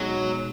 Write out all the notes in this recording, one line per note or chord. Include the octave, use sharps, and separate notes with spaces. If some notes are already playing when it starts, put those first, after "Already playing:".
Already playing: B2 F#3 G#3 D#4 G#4